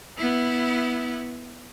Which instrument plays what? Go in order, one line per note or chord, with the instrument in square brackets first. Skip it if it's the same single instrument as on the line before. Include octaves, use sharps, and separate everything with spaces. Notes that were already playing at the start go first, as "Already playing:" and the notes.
[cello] B3 E4